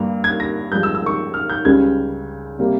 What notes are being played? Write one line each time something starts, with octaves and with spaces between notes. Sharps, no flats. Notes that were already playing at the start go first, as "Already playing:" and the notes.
Already playing: G2 G3 A#3
G#6
A#6
G2 F3 G#3 G6
E6
E6
C#6
F6
G6
C#2 C#3 G3 G#6
C3 G3 A#3